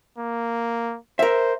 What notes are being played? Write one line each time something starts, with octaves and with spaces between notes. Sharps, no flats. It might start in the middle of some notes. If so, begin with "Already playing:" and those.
A#3
A#4 C5 E5